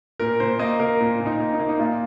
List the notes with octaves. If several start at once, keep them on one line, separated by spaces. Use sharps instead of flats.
A#2 A#4
A#2 C5
A#3 D#5
A#3 A#4
A#2
A#2
D#4
A#3
D#4
A#3
D#4
A#2 F4